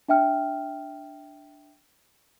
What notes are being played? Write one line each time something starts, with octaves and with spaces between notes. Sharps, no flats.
D4 E5 G5 F6